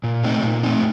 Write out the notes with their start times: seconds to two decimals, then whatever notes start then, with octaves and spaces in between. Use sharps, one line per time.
0.04 A#2
0.24 A3 C4 D#4
0.43 A#2
0.63 A3 C4 D#4